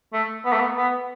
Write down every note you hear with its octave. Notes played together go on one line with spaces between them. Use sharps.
A3
B3
A3
B3
B3